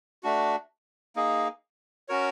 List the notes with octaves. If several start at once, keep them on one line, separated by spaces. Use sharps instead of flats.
A3 D4 F#4
A#3 D#4 G#4
C#4 F#4 A#4 C#5